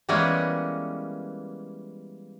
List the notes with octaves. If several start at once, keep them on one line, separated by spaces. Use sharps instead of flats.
E3 G3 G#3 A#3 B3 C#4